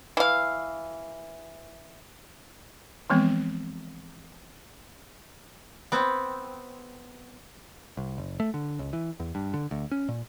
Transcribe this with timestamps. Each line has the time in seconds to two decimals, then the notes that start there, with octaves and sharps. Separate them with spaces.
0.17 E3 F5
3.10 E3 F3 G#3 B3 C4
5.92 B3 C4
7.97 C2
8.18 F#1
8.40 A3
8.54 D3
8.79 C#2
8.93 E3
9.20 E2
9.35 G2
9.54 D3
9.71 D2
9.91 C#4
10.08 A#2